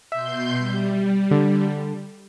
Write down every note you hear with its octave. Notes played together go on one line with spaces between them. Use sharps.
B2 E5 C6 G6
G3
D3